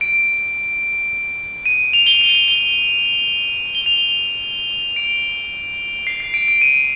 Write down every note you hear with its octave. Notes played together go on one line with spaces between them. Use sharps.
D7
D#7
F7
G7
F7
D#7
G7
G7
F7
D7
C7
C7
D7
D7
D#7